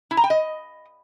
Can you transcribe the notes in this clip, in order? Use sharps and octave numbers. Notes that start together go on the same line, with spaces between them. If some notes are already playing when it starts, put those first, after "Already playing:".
E4
A#5
G5
D#5